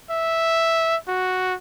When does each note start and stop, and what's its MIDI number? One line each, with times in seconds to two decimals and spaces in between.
0.10 0.96 76
1.08 1.54 66